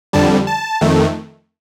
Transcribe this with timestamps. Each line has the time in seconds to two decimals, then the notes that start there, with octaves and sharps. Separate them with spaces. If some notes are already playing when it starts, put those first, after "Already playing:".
0.13 F2 D3 G3 A5
0.47 A5
0.81 F2 D#3 A3